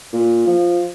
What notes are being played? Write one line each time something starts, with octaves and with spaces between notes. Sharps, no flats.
A#2
F3